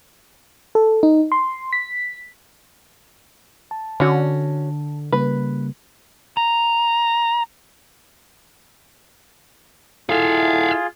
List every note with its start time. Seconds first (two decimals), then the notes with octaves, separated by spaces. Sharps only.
0.75 A4
1.03 D#4
1.32 C6
1.73 B6
3.71 A5
4.00 D3 C#4 F#4
5.12 C#3 G3 A#3 B4
6.37 A#5
10.10 E4 F4 G#4 A4 E5 F5